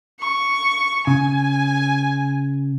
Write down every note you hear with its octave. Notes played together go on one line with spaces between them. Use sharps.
C#6
C#3 G#5